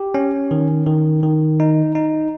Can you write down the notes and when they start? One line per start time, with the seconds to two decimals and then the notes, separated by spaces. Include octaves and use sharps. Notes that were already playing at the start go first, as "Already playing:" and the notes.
Already playing: G4
0.14 C#4
0.51 D#3
0.86 D#3
1.23 D#3
1.60 D#4
1.95 D#4